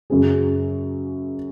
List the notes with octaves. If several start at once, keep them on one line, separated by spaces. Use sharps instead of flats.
F#2 C#3 F#3 C#4 G#4